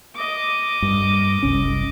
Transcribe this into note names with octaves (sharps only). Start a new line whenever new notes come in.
D#5 D6
G2
F#1 C2 C#4